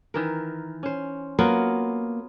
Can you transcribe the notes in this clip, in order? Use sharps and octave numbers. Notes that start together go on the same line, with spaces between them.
D#3 E3 A#4
C#4 C5
F#3 A#3 B3 F4